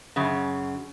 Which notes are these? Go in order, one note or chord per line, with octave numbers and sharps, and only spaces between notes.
F#2 C#3